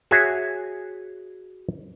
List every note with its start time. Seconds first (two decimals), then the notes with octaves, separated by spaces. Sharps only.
0.11 F#4 G#4 C#5 E5 G#5